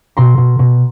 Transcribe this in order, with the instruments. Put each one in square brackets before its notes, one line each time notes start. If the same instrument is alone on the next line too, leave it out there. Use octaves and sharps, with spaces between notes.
[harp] B2 A#5 C6
B2
B2